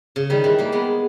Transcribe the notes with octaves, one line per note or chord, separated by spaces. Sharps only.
C#3
D#3 G3
E3 G#3
G3 A#3
G#3 B3